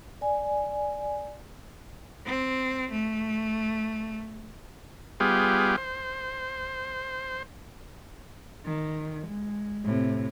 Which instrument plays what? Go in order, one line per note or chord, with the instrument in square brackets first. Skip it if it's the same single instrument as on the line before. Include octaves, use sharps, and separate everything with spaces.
[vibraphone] D5 G#5
[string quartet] C4
A3
[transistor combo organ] G3 B3 F4 G4 G#4
C5
[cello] D#3
G#3
A2 C3